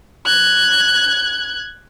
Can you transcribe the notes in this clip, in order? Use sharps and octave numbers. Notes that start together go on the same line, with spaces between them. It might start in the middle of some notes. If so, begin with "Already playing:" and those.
F#6 G#6